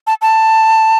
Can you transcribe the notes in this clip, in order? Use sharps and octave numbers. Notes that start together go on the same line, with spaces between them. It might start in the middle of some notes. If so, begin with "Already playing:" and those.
A5
A5